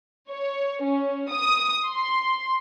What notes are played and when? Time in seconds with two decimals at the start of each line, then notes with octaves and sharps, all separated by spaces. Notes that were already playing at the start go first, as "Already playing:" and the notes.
0.30 C#5
0.83 C#4
1.30 D#6
1.86 C6